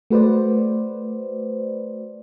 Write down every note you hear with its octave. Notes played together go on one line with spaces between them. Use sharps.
A3 F#4 B4 C5 D5